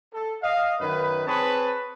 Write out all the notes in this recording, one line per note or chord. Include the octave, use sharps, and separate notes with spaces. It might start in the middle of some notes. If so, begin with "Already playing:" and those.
A4
D#5 F5
F#2 D#3 B4
C4 G#4 B4 C#5 A5